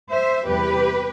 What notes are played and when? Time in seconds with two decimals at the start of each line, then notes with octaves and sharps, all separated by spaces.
0.11 C5 E5
0.48 E2 C3 G3 G4 B4